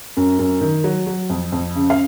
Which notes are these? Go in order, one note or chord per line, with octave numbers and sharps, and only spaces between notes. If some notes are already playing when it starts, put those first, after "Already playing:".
F#2
F#2
D#3
F#3
F#3
F2
F2
C#3
F5